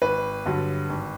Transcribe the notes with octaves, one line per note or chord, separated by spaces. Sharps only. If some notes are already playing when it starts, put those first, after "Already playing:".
G#1 B4
G2 D3 F#3
G#1